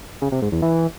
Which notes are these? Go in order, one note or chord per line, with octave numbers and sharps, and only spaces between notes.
C#3
C3
G#2
E2
E3